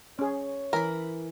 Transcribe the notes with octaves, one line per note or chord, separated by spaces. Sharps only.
C#4 G#4 C#5
E3 A#4 B5